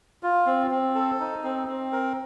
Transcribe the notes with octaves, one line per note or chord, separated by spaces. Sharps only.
F4
C4
C4
A4
D#4
C4
C4
A#4